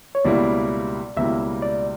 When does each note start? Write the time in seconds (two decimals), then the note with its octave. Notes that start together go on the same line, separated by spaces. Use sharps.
0.15 C#5
0.25 C#2 B2 G3 A#3 E4 D5
1.17 C#2 B2 G3 A#3 E4 E5
1.62 D5